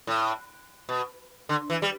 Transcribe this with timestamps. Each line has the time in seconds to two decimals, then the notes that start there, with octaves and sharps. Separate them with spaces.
0.07 A2
0.89 B2
1.49 D3
1.70 E3
1.82 G3